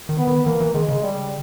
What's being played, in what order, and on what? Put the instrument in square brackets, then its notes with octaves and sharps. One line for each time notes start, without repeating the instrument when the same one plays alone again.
[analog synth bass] D#3
[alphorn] B3
[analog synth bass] D#3
[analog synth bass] E3 [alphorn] A#3
[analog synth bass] E3
[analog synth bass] D#3 [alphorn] G#3
[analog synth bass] C#3
[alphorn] G3